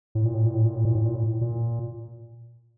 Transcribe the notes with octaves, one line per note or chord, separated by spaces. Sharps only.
A2
A#2
A2
A#2
A2
A#2
A2
A#2
A2
A#2
A2
A#2